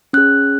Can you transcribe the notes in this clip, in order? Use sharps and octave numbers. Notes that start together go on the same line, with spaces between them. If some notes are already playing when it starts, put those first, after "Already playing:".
C#4 G#4 F#6